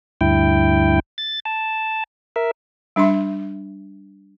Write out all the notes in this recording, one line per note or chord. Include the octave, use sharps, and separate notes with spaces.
D2 G2 E4 G5
A6
A5
A#4 E5
G3 D4 E5 C6